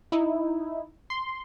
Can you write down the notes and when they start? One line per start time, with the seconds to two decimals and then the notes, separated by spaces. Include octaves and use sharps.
0.12 D#4 E4
1.10 C6